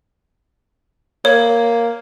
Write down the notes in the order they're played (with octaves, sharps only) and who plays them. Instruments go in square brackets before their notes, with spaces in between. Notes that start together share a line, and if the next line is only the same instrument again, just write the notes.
[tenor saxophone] A#3 [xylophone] C#5